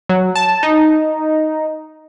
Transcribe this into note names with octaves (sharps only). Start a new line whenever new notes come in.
F#3
A5
D#4